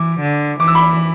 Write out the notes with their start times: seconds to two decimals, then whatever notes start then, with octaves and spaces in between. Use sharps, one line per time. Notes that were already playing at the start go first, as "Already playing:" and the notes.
Already playing: E3 D6
0.21 D3
0.60 E3 D6
0.68 E6
0.75 B5 D6